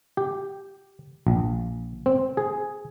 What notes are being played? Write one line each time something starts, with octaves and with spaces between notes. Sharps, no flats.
G4
A#1
C4
G#4